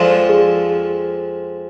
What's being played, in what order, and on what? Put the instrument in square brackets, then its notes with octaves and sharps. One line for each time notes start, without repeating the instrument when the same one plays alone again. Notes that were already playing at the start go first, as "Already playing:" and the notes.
Already playing: [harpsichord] F2 F3 G#3 [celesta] D5
[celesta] G#4